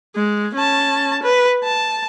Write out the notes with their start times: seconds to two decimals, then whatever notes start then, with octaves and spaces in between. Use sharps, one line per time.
0.16 G#3
0.54 C#4 A5
1.22 B4
1.63 A5